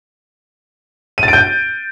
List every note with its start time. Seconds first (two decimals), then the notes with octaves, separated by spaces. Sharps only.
1.18 D#7
1.23 A6
1.28 D7
1.33 G6